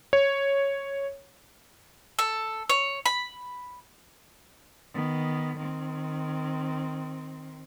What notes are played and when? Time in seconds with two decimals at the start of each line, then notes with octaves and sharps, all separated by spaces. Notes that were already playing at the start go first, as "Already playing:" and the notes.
0.13 C#5
2.19 A4
2.69 C#5
3.06 B5
4.94 D#3 B3
5.57 D#3 C4